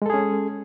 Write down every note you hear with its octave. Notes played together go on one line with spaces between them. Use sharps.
G#3 C#4 G#4 A4